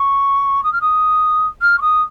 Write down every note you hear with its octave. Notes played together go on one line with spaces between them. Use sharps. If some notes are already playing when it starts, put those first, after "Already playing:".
Already playing: C#6
D#6
F6
D#6
F6
C#6
D#6